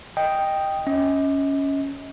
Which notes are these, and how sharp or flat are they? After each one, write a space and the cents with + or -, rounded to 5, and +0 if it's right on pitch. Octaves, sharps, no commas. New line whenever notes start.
D#5 +0 G5 +0
C#4 +5 D#5 +35